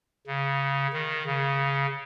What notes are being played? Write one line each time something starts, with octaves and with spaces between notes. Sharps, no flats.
C#3
D#3
C#3